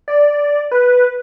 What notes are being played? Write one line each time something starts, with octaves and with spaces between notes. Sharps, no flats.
D5
B4